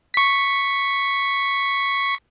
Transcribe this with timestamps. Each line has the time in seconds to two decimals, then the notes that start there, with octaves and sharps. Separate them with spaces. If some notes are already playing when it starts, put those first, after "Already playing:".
0.14 C#6 B6